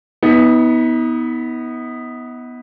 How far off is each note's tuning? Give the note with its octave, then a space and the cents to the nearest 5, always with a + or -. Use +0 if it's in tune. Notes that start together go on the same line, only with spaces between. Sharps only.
B3 +0 D#4 +45